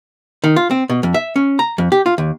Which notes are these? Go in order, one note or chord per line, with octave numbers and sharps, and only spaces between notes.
D#3
F4
C4
B2
F2
E5
C#4
A#5
F2
G4
F4
D#2